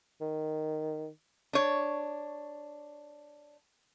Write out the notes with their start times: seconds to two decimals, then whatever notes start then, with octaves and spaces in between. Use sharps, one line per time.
0.21 D#3
1.53 D4 C#5